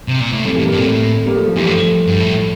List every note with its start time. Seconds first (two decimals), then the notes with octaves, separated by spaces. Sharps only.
0.08 C3
0.20 A#2
0.33 A2
0.45 G2 A3 C4
0.55 A2 E3 G3
0.65 G3 A#3
0.72 G2
0.75 A#2 A3 C4
0.86 A2
1.26 G3 A#3
1.35 F3 A3
1.46 F3
1.56 F2 E3 G3
1.66 G2 F3 A3
2.07 G2
2.20 A2